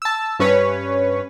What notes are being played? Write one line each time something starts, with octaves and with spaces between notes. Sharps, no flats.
A5 E6
G2 C#4 B4 C#5